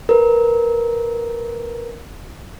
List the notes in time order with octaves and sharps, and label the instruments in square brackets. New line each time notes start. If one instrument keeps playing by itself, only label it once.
[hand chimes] A#4 B4